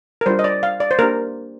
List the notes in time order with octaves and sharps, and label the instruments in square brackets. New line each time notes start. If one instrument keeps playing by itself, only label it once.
[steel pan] A#4
G3 D4 F4 C5
D#5
D5
F5
D5
C5
A#3 D4 G4 A#4